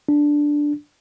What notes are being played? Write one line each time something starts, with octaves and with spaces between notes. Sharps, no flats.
D4